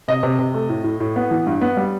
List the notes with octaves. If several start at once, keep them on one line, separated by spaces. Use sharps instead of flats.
C3 D#5
C3
C3
A3
A2
A2
A2
B3
E3
G2
B3
G3